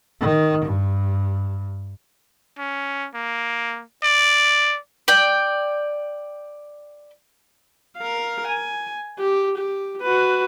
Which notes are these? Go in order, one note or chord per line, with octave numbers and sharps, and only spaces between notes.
D#3
G2
C#4
A#3
D5
D5 G5
A#4 F5
G#5
G4
G4
F#4 B4